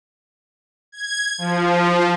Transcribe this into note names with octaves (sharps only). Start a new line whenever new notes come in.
G#6
F3